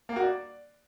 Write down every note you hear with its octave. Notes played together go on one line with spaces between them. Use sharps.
A#3
F#4
D5